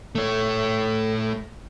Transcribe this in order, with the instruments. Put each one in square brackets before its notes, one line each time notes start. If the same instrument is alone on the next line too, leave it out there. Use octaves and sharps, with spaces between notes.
[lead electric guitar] A3 C#5